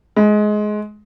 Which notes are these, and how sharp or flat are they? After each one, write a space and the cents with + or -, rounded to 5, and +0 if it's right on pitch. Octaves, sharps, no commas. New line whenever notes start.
G#3 +20